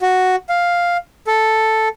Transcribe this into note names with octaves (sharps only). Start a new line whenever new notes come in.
F#4
F5
A4